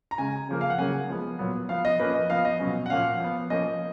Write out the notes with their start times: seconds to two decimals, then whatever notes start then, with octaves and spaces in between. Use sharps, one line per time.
0.11 A#5
0.18 C#3 G#3 C#4 G#5
0.49 C#3 F3 A#3
0.61 F5
0.70 F#5
0.79 C#3 F#3 A#3 C#4 G#5
1.09 F3 G#3 B3
1.39 A#2 F#3 B3
1.69 F3 B3 F5
1.85 D#5
1.99 F3 A#3 C#4 B4
2.15 D#5
2.30 F3 B3 F5
2.45 D#5
2.60 B2 F#3 C#4
2.86 F#5
2.90 A#2 F3 A#3 C#4 F5
3.20 F3 B3
3.50 F3 A#3 C#4 D#5